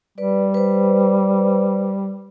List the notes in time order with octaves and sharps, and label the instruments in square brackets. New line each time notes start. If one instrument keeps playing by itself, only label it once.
[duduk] G3 [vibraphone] B4 D5
[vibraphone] B4 C5